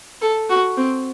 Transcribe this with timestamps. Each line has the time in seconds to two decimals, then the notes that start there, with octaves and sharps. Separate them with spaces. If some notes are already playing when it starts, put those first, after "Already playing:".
0.22 A4
0.49 F#4
0.77 C4